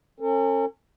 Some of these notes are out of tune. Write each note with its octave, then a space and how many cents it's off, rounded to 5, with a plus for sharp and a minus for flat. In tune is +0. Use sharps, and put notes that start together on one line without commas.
C#4 -35 A4 +45